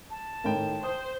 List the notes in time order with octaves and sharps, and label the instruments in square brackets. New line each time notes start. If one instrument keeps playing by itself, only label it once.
[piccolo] A5
[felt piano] A2 D#3 [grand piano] A#4 G5
[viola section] C5 [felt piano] D#6